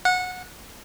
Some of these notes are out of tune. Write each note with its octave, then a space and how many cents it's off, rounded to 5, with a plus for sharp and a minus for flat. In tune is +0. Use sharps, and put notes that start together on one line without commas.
F#5 -20